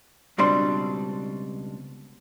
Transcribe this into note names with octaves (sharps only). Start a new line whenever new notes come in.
C#2 B2 G3 C4 D4 C6